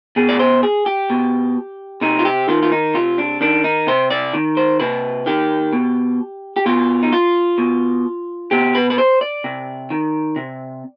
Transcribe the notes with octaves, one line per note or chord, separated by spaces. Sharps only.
B2 G#4
D5
C5
G#4
G4
B2
C3 D#4
F4
G4
D#3 F4
F4
D#4
C3 F4
D4
D#3 D4
D#4
C3 C5
D5
D#3
C5
C3 B4
D#3 G4
B2
G4
B2 F4
D#4
F4
B2
B2 G4
B4
B4
C5
D5
C3
D#3
C3